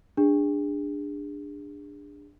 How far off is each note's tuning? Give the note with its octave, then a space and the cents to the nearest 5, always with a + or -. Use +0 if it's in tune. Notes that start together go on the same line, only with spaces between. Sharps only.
D4 +0 G#4 -30